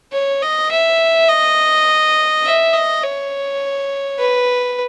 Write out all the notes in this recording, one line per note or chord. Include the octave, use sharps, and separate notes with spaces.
C#5
D#5
E5
D#5
E5
D#5
C#5
B4